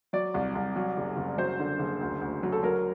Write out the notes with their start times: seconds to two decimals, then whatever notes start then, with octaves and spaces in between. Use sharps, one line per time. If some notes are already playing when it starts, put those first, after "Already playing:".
0.13 F#3 D5
0.34 C2
0.55 C2
0.76 F#3
0.97 F#1
1.17 F#1
1.38 F#3 C5
1.60 D3
1.79 F#1
2.01 D2
2.21 D2
2.43 F#3
2.52 A4
2.63 F#3 A#4